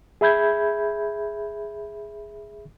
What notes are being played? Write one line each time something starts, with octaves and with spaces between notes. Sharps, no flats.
G#4 E5 B5 G6 G#6